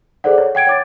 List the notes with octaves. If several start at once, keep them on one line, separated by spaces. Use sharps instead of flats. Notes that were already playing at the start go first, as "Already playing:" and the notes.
G#4 A4 C5 D5 F#5
C#5
F#5 G5 G#6 D7
C#5 D6 A6